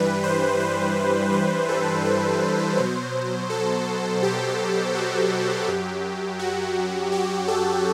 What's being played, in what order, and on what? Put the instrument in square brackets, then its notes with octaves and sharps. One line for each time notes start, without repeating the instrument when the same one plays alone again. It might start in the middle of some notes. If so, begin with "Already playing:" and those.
Already playing: [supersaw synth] G2 E3 G3 B4
C5
C5
B4
A4
B4
B2 F#3 C5
A4
G4
F#4
F#2 F#3 G4
F#4
G4
A4